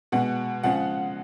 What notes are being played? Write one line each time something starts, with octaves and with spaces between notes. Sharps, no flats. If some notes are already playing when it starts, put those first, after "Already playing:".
B2 G#3 F#5
C#3 F3 G#3 F#5